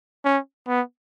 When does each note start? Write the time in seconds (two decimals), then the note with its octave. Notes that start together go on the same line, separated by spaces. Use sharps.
0.25 C#4
0.68 B3